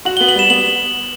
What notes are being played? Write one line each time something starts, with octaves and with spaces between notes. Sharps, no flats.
F#4 F#7
B3 G7
F#7
G3 E7
B3 F#7